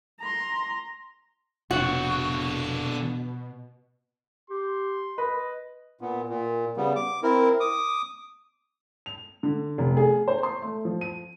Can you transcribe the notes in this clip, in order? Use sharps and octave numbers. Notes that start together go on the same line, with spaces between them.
A#5 C6
F1 B2 D3 F#4 C#5
G4 C6
B4 D#5
A#2 B3
A#2
C#3 G3 B3
D6
C4 E4 A#4
D6 D#6
F7
D3
F1
G#4
C5
C6
A3
F3
D#7